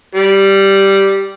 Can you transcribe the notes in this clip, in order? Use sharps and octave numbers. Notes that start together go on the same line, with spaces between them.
G3